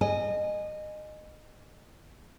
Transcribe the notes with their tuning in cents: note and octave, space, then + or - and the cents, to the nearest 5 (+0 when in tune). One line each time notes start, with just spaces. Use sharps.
D#5 -20 G#5 +0